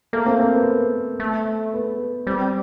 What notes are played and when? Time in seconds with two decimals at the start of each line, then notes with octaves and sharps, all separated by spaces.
0.13 A3 A#3
0.26 C4
0.39 C4
0.53 B3
1.20 A3
1.74 B3
2.27 G3 C4